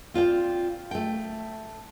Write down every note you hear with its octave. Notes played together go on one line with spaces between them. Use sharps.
C4 F4 D5 G5
A3 G5